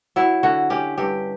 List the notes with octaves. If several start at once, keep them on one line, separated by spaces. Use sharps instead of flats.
F#3 E4
D3 F#4
C#4 G4
G2 G4